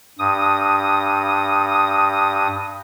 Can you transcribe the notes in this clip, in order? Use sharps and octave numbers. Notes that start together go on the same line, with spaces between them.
G2 D#6